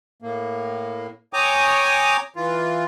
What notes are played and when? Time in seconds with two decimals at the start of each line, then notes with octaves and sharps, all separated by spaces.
0.22 A2 A#3
1.33 C#5 G5 G#5 A#5 D6 D#6
2.36 E3 F4